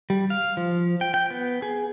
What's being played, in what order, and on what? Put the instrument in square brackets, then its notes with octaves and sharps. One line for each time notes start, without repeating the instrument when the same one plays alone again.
[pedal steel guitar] G3
F5
F3
G5
G5
B3
G#4